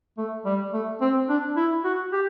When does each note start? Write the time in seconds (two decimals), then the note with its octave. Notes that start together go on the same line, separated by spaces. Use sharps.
0.18 A3
0.46 G3
0.73 A3
1.01 C4
1.29 D4
1.56 E4
1.84 F#4
2.13 G4